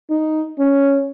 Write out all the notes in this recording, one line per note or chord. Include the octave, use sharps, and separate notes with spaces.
D#4
C#4